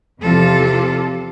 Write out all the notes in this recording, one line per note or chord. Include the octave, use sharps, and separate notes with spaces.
E2 C3 F3 F4 A4